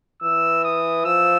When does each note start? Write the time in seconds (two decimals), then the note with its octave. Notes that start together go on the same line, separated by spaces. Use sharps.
0.22 E3 E6
0.64 D#6
1.05 F3 E6